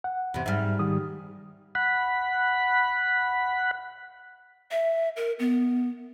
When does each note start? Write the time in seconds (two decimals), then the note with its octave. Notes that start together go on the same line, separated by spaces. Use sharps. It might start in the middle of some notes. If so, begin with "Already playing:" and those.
0.04 F#5
0.34 E2 C3
0.46 G#2 G3 E5 F6
0.79 D#3 G4 D#6
1.75 F#5 B5
4.71 E5
5.16 A#4
5.39 B3